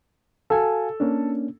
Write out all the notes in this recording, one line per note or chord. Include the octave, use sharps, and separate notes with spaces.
F#4 A4 F5 G#5
A#3 C#4 D4